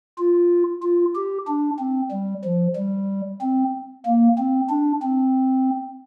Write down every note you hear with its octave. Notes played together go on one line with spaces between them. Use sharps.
F4
F4
G4
D4
C4
G3
F3
G3
C4
A#3
C4
D4
C4